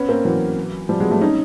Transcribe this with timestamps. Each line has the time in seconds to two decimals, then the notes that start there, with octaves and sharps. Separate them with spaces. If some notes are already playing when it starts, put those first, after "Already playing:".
Already playing: B3 C#4
0.09 A#3 C4
0.25 E3 F#3
0.89 F3 G3
1.00 F#3 G#3
1.11 G3 A3
1.21 C#4 D#4